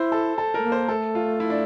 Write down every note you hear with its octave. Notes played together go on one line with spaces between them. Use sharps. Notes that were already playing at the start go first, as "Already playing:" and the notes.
Already playing: E4 C5
A4
A4
A3 A#4
A#3
C5
A3 A4
F4
E4
D4